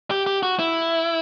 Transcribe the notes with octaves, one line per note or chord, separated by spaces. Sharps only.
G4
G4
F#4
E4